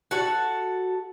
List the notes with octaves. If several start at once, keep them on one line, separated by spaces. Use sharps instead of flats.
F#4 A4 F#5